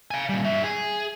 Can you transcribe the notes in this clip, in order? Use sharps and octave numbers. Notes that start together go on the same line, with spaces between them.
F5 G#5
A#2 G3
G2 E5
G#4